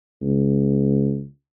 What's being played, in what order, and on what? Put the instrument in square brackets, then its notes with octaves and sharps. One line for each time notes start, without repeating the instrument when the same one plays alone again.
[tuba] C#2